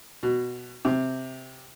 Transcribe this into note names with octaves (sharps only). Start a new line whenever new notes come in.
B2
C3